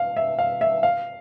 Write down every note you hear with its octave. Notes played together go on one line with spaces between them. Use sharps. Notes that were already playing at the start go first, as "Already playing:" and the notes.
Already playing: F5
E5
F5
E5
F5